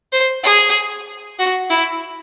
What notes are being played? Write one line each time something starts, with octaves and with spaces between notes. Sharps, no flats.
C5
G#4
F#4
E4